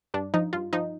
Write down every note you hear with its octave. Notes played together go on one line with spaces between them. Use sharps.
G2 D4
F3 D#4
G2 F4
F3 D#4